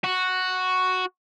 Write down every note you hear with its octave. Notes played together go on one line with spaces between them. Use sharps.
F#4